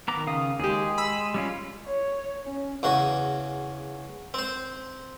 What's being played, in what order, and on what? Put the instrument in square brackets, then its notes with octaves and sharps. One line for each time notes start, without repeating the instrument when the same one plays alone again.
[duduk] D#3 [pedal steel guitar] B3 A#5 D6
[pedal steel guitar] C#3 F5 D#6
[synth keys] D#2 G4 [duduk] G#3 [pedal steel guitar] G#4
[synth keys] B5 E6
[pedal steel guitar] G3 C#4 F4
[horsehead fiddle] C#5
C#4
[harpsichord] E2 C#3 F#4
C4 C5